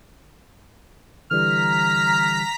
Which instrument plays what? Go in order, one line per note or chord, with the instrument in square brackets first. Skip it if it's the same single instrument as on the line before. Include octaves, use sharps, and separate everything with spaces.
[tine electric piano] D3 E3 G3 [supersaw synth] A#5 B6 [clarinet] F6